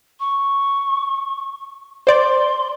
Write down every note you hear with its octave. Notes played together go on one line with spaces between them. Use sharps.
C#6
C5 D5 C6